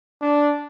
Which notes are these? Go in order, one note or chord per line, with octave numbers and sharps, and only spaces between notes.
D4